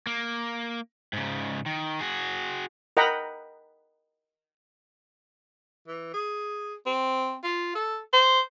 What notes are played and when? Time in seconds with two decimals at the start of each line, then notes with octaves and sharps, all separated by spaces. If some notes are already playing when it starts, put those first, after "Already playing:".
0.07 A#3
1.13 G#2 C#3
1.66 D#3
2.00 F#4 G#4
2.97 A#4 D#5 F#5 G5 A#5 B5
5.88 E3
6.14 G#4
6.86 C4
7.44 F4
7.75 A4
8.13 C5